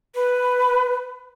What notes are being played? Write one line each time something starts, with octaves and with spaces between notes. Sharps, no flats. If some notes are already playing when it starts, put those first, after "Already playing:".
B4